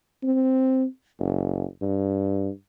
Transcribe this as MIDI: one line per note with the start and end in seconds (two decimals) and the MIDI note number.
0.24 0.85 60
1.19 1.64 30
1.82 2.49 43